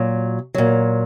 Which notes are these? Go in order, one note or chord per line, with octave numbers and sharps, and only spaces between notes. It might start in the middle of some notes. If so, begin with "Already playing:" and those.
Already playing: A#2 F#3
A#2 F#3